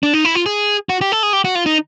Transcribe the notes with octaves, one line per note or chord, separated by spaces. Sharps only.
D4
D#4
E4
F4
G#4
F#4
G4
A4
G#4
G4
F#4
F4
D#4